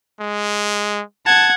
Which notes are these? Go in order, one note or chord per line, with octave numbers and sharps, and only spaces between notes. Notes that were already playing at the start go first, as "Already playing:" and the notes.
G#3
F#5 A5 G#6